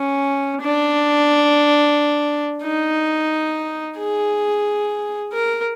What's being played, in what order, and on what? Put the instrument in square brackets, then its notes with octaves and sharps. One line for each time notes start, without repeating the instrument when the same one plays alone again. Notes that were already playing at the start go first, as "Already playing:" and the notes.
Already playing: [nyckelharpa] C#4
D4
D#4
G#4
A#4